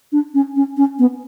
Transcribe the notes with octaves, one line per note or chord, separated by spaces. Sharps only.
D4
C#4
C#4
C#4
B3